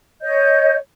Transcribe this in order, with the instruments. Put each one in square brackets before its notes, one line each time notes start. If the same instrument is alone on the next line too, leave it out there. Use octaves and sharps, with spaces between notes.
[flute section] C#5 D#5 G6